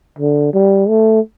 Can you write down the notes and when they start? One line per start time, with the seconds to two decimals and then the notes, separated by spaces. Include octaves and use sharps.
0.19 D3
0.54 G3
0.88 A3